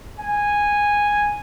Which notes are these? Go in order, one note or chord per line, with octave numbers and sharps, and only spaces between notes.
G#5